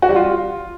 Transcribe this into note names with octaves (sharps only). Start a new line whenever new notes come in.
F#4
G3
F4